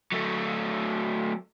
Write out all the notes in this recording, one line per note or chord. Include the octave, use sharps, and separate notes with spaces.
F#3 A3